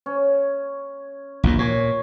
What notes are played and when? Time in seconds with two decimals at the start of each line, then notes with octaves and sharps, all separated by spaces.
0.06 C#4
1.43 A#1 D#2 A#2
1.59 A#2 C#5 G#5 D6